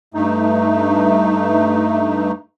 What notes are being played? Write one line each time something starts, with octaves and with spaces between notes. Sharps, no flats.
G2 A3 D#4